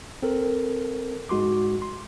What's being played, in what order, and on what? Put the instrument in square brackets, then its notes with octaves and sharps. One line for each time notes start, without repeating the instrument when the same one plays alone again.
[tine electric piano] C4 A4 A#4
G#2 G#3 F#4 C6 D6
C6